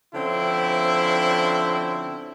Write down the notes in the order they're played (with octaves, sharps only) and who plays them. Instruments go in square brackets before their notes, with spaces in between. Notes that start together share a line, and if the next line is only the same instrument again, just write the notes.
[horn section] D3 F3 C4 C#4 E4